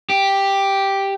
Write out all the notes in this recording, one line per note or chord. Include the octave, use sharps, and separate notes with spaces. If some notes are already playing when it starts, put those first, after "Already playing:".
G4